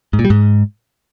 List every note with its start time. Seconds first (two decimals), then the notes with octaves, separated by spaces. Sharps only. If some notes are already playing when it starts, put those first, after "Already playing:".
0.13 G#2
0.19 A#2
0.25 G3
0.30 G#2